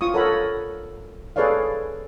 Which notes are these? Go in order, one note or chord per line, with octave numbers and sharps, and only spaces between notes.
F4 C#6 D#6
A4 A#4 C#5 F#5 B5
G#4 A4 B4 C#5 D5 F5